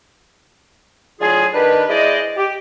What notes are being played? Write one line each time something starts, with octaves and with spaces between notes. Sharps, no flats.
A2 D3 F#3 F4 G#4
D#3 D4 G4 B4
G#3 E4 C5 D5 D#5
G4